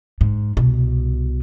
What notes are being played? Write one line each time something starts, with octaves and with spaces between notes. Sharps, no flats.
G#2
C2 B2